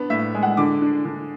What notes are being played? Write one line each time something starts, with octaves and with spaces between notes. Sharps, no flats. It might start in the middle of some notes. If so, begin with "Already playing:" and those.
Already playing: B3 D4
A2 E5
G#3
F#5
D3 D6
D4
D3